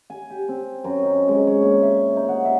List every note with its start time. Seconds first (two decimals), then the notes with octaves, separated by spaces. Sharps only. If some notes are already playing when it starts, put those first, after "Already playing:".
0.10 G#5
0.30 G4
0.49 C4
0.84 F#2
1.03 D#4
1.28 G#3
1.47 C#5
1.63 A#2
1.83 E5
2.16 D#4
2.29 F#5
2.45 E5